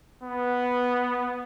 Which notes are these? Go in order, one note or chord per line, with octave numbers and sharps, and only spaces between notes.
B3